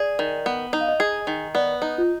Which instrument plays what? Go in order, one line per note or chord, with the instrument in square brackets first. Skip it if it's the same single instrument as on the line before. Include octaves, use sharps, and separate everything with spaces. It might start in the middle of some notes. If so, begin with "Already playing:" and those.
Already playing: [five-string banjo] G#4 [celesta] D5
[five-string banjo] D#3
B3
[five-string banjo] D#4 [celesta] D#5
[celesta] F5
D#5
[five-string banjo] G#4
D#3
[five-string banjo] B3 [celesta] D5
[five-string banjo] D#4
[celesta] F4